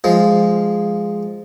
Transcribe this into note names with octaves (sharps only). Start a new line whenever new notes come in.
F3 G#3